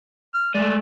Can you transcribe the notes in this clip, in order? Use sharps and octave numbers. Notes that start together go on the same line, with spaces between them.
F6
G#3 A3 D5